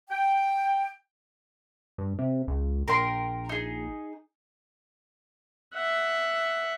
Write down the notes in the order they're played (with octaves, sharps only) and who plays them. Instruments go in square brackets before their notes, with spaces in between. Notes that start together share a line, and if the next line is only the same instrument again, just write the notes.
[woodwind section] G5
[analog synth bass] G2
C3
C#2
[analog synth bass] A#1 [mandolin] A#4 G5 C6
[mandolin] D#4 G#4
[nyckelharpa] E5 F#5